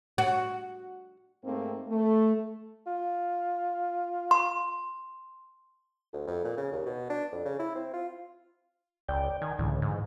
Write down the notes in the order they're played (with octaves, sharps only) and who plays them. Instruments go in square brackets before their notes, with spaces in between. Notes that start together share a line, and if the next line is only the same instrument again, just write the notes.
[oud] F#4
[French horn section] G#2 A3 A#3 C4
A3
[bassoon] F4
[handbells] C6
[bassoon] D2
F2
A#2
C#3
D#2
B2
D4
F2
C#3
E4
C4
F4
[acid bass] C#2 [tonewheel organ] D5 G5
[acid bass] D#3 [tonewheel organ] G#5
[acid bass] C#2 [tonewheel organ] A2 D3 E3
[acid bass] G#2